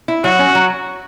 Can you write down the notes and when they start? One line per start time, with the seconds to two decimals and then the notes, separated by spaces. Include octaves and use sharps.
0.08 E4
0.24 F#3 F#4
0.39 C#4
0.55 F#3